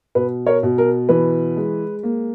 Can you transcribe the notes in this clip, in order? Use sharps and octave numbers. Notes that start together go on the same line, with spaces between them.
B2 B4
A#4 C#5
B2
A#4
E3 B4
G#3
A#3